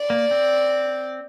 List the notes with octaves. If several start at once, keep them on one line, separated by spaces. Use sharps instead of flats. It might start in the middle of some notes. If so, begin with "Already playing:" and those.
Already playing: D5
A#3
C4